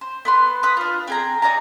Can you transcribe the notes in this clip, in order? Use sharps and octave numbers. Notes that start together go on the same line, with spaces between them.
C5
B3 B4 C6
B4 D#6
D4 F4
C4 G#4 A#5
D#4 D5 G#5 A#5